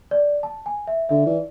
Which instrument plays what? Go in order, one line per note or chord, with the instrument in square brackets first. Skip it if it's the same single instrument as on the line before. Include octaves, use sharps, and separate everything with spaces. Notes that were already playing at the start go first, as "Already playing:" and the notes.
[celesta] D5
A5
G#5
E5
[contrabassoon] D3 [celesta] E5
[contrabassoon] E3 [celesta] D5